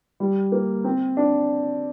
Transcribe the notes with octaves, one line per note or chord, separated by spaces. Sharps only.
G3
A#3
C4
D4